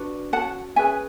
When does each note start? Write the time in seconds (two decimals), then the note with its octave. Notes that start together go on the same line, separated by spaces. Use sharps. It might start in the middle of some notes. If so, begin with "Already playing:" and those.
Already playing: D4 F#4 B4
0.33 C#4 F#4 B4 F#5 A5
0.76 C#4 G#4 B4 E5 G#5